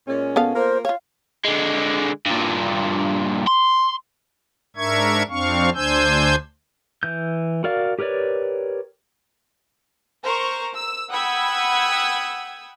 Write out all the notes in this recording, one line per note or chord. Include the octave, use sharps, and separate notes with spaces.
A#2 G#3 C#4
B3 A4 F5
A#3 F4 A#4 C5
F4 C#5 F5
D3 G#3
G2 A#2
C6
G#2 D4 A#4 E5 C#6 G#6
F2 C4 D4 F5 C#6
D2 D4 C5 G#5 E6 G6
E3 G6
F#4 A#4 D5 F5
G4 A#4 B4 C#5 D5
A#4 C5 A#5 C#6
E6
F#5 G5 B5 D#6 E6 G#6